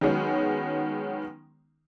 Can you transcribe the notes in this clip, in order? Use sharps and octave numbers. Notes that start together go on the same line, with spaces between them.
D#3 F#3 G#3 B3 C#4